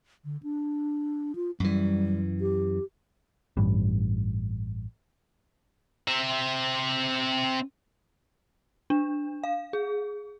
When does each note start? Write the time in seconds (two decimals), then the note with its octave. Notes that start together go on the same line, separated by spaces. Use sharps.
0.25 D3
0.43 D4
1.35 F4
1.60 F#2 E3 G3
2.41 G4
3.57 A1 G2
6.08 C4 E5
8.90 D4
9.44 F5
9.73 G#4